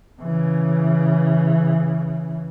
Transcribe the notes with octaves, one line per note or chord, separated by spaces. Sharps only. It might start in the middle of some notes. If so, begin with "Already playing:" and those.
C#3 E3